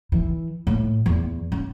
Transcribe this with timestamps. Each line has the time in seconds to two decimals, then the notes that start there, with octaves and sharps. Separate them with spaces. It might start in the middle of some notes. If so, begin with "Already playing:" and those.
0.12 E3
0.67 A2
1.06 E2
1.52 C#4